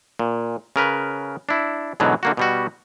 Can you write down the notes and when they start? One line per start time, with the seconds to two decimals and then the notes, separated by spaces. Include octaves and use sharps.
0.19 A#2
0.76 C#3 A#4 B4
1.49 D4 E4
2.00 G#2 B2 D3 E3 F#3
2.23 D3 A#3 F#4
2.37 B2 G3 F#4